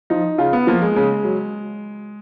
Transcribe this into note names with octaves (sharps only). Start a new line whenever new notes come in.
F3 D#4
C#3 F4
B3
F3 A#3
G#3
C#3
F#3